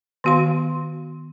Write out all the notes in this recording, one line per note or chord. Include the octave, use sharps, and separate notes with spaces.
D#3 B3 F#4 F5 C6